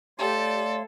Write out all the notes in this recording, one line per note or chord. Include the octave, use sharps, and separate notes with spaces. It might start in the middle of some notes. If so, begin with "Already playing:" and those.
A3 G4 A4 C#5 D5 F5 C6